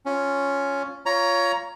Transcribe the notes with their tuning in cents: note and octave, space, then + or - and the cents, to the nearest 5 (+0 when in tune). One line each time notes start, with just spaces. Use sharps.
C#4 +5 F4 +0
F4 -10 C#5 +15 A#5 +10